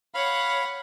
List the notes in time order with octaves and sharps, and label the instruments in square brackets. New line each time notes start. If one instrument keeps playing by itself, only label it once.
[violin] C#5 F#5 [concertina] F5 B5